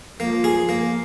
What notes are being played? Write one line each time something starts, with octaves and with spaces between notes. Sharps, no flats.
F3 A#3
G#4
A#3